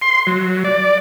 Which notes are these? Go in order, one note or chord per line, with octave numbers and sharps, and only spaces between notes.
C6
F#3
D5